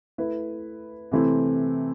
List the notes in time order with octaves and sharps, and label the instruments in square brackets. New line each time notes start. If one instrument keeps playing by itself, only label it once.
[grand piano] A3 E4 B4
C3 E3 A3 C4 E4